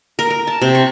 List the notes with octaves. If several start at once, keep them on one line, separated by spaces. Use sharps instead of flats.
A#4
A#4
A5
C3
C#6